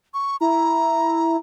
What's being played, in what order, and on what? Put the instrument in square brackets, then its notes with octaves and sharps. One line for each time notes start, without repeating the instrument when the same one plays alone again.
[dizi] C#6
[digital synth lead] E4 [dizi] A#5